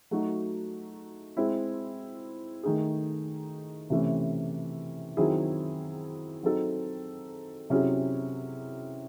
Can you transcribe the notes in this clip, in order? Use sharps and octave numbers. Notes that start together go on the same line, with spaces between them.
F#3 A3 D#4 F#4
G#3 C4 E4
D#3 A3 D#4 G#4
C3 E3 A3 C#4
D#3 F#3 C4 E4 G#4
F#3 C4 D#4 A4
C3 F#3 C#4 E4 G#4